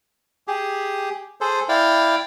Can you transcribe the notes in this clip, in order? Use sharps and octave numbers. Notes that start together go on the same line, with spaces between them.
G4 G#4
G#4 A4 C5
E4 D5 F5 G5